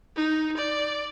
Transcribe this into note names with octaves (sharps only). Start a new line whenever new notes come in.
D#4
D5